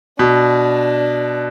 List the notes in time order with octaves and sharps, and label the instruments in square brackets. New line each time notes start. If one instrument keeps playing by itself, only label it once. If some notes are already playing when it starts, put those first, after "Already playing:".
[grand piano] B2 [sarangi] D4